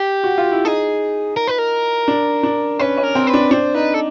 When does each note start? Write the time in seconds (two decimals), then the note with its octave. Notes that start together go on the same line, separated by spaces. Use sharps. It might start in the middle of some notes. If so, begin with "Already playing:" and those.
Already playing: G4
0.24 F#4
0.38 F4
0.51 E4
0.65 D#4 G#4
1.37 A#4
1.48 B4
1.58 A#4
2.08 D4
2.43 D4
2.79 C#4 B4
2.97 C#4
3.03 A#4
3.15 C4
3.27 B4
3.33 D4
3.51 D4 C5
3.75 D#4 B4
3.94 A4